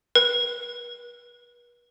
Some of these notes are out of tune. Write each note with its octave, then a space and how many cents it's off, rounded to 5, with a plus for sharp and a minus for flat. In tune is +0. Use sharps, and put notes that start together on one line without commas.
B4 -40